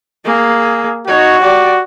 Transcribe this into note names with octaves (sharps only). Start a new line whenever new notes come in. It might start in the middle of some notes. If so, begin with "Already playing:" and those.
A#3 G#4
D#4 F#4 C#5
G4 D5